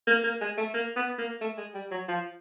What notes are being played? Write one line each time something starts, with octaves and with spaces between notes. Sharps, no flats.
A#3
A#3
G#3
A3
A#3
B3
A#3
A3
G#3
G3
F#3
F3